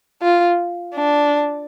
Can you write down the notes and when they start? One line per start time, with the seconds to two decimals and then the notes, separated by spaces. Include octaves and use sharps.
0.22 F4
0.95 D4